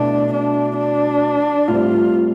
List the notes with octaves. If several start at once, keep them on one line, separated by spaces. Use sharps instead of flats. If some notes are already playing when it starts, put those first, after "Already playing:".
Already playing: B2 A3 D4 E4
D4
D4
A2 G3 C4 F4